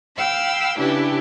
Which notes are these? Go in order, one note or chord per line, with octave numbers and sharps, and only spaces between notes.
F5 G5 B5 E6
C#3 D4 E4 G4 B4